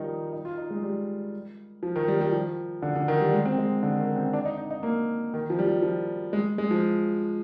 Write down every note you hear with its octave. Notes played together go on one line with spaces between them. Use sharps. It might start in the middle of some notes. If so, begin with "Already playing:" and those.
Already playing: D#3 F3 G3 D#4
D#4
F4
D#4
G#3
G3
F3
D#3
G3
G3
F3
D3
D3
D#3
G3
G#3
C4
G#3
D3
D#3
C4
D4
D#4
D#4
D#4
A#3
D#3
F3
G3
F3
F3
G#3
G#3
F3